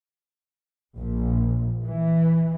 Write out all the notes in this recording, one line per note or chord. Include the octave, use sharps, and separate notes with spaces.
A#1
E3